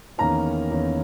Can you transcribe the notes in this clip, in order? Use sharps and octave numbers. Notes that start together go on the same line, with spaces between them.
E2 D#3 A#3 C#4 A#5
E2 D#3 A#3 C#4